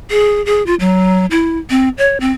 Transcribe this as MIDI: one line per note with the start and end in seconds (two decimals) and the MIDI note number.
0.10 0.44 68
0.46 0.64 68
0.66 0.75 65
0.80 1.26 54
1.31 1.58 64
1.70 1.89 60
1.98 2.18 73
2.20 2.31 60